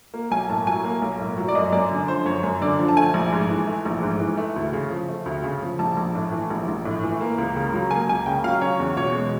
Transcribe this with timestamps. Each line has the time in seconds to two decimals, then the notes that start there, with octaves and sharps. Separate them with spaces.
0.14 A#3
0.31 B1 G#5
0.49 A2 A5
0.67 F#3 G#5
0.84 A#3
1.02 B1
1.19 A2
1.37 F#3
1.48 D5
1.55 F#2 D#5
1.72 F#2 D5
1.91 D3
2.08 F3 C5
2.26 F#2 C#5
2.43 F#2
2.61 D3 D5
2.79 F3
2.88 A5
2.97 A3 G#5
3.14 A#1
3.32 G#2
3.49 E3
3.67 A3
3.85 A#1
4.03 G#2
4.20 E3
4.37 A3
4.56 D2
4.73 C#3
4.90 F3
5.08 A3
5.26 D2
5.44 C#3
5.62 F3
5.79 A#1 A5
5.97 A#1
6.15 A2
6.32 E3
6.50 A#1
6.68 A#1
6.85 A2
7.03 E3
7.21 A#3
7.38 C#2
7.56 C#3
7.74 F#3
7.91 A#3 G#5
8.08 C#2 G#5
8.26 C#3 G5
8.44 F#3 F5
8.61 C#4 C#5
8.80 E2
8.97 B2 C#5
9.15 G#3